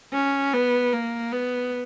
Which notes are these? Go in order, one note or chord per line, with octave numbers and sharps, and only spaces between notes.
C#4
B3
A#3
B3